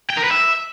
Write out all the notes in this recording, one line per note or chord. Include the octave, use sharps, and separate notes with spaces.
G5
A#4
B4
E5